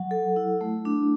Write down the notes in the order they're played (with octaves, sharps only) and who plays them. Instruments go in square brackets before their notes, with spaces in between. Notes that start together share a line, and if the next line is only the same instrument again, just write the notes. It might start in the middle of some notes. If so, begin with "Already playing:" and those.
Already playing: [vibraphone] F#3 F#5
A4
E4
A3
D4